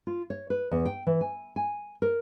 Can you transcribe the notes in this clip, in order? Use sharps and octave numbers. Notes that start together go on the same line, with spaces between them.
F4
C#5
B4
E2
G5
E3
G#5
G#5
A#4